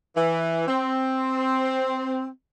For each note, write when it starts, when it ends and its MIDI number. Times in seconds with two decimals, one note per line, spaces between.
0.17 0.67 52
0.68 2.27 60